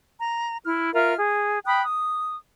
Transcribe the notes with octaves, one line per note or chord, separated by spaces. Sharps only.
A#5
E4 F6
F4 A#4 E5 F6
G#4
G5 B5 D#6 F#6
D#6